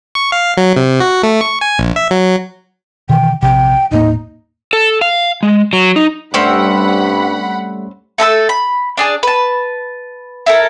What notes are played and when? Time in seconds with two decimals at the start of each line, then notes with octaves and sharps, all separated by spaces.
0.15 C#6
0.32 F5
0.57 F#3
0.76 C3
1.01 F#4
1.23 A3
1.41 C#6
1.61 G#5
1.79 A#1
1.96 E5
2.11 F#3
3.09 B2 D#3 E3 G5
3.42 A#1 C3 G5
3.91 D#1 A2 A#3 D#4
4.73 A4
5.01 F5
5.43 G#3
5.73 F#3
5.96 D#4
6.34 G2 G3 A3 C4 C#4 F#5 G5 B5
8.18 A3 A4 B5 E6
8.49 B5
8.97 D4 G#4 D5
9.23 B4 A5
10.46 E4 A4 A#4